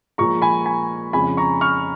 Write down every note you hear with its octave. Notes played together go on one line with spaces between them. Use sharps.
A#2 F3 G#3 A#5 C#6
G#5 B5
G#5 B5
F2 C#3 G#3 G#5 B5
A#5 C#6
C#6 F6